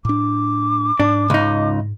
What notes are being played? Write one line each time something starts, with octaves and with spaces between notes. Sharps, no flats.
A2 D4 D6
G#2 D4
C#2 D#4